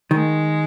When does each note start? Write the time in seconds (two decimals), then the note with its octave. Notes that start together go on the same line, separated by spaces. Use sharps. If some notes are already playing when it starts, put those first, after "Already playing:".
0.11 D#3 G#3